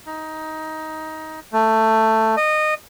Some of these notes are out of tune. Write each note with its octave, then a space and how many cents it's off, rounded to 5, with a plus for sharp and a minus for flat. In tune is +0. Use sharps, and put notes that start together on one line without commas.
D#4 +15
A3 +10
D#5 -20